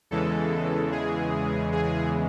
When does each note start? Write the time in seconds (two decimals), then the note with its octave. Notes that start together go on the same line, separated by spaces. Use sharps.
0.11 E2 C#3 E3 G#3 A4
0.92 G#4
1.72 G#4